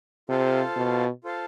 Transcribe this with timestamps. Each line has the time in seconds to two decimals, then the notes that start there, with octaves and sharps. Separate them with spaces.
0.29 C3 F4 A4 C5 F5 A5
0.76 B2
1.24 F4 A4 C5 F5 A5